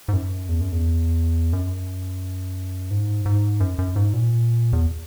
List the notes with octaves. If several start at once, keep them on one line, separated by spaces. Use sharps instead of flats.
G#2
F#2
E2
F#2
E2
F#2
G#2
G#2
F#2
F#2
G#2
A#2
E2